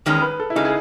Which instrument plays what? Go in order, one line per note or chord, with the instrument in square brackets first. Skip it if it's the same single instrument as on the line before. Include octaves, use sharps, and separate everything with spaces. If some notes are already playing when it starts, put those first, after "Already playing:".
[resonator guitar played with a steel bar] E2 D#3 G#3 C#4
[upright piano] B4
A4
E4
[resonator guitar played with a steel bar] C#3 G#3 [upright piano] D#4
[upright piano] G#4